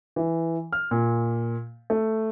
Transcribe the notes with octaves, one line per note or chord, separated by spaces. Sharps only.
E3
F6
A#2
A3